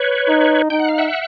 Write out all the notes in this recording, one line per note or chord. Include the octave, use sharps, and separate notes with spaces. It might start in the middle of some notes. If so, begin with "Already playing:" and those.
Already playing: B4 C#5
D#4
D#4 G5
F#5
F5
E5 F#5